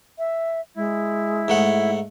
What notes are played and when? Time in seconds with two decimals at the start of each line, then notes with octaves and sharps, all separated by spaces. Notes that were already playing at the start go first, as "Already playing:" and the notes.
0.19 E5
0.76 G#3 E4
1.48 G#2 A3 F#5